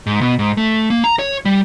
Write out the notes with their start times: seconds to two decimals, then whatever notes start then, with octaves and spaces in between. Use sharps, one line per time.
0.07 G#2
0.21 B2
0.39 G#2
0.57 A3
0.90 A#3
1.04 A#5
1.19 C#5
1.45 G3